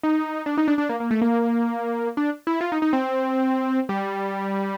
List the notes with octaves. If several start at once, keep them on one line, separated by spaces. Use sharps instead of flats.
D#4
D4
D#4
D4
D4
A#3
A#3
A3
A#3
D4
E4
F4
D#4
D#4
C4
G3